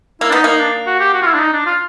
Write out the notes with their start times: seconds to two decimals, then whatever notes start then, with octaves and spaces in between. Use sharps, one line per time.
0.21 A#3 E4
0.29 D4
0.32 B3 D#4
0.44 A#3 D#4
0.60 D4
0.86 F#4
1.00 G4
1.13 F#4
1.22 F4
1.26 E4
1.34 D4
1.40 D#4
1.53 D4
1.66 F4